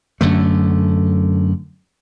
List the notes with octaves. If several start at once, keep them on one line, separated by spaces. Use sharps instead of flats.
F#2 D3 A3